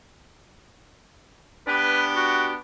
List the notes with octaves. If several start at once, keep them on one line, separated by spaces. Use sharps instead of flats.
B3 D4 G4 B4
F#4